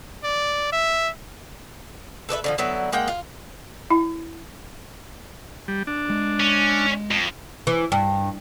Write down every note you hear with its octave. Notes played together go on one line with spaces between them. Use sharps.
D5
E5
A4 B4 D5 E5
D3 E3 F3
D3 F#3 B3 E4
G#3 A#3 F#5 G5
F4
E4
G3
D4
G#3
C#4
F2
E3
G2